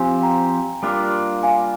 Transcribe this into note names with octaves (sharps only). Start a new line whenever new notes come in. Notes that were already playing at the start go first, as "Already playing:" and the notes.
Already playing: F3 C4 G4 F5 G#5
G5 A#5
G3 A#3 D4 F4
F5 G#5